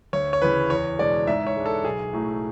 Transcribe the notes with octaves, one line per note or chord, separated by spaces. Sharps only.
D2 C#5
C#5
C#3 E3 B4
E2 C#5
B2 G#3 D4 D5
G#2 E5
C#5
G#3 D4
A4
B1 G#4
A2 F#3 A3